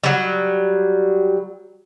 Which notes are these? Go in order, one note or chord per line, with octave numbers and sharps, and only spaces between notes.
F#3 G3